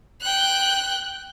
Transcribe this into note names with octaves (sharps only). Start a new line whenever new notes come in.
G5 F#6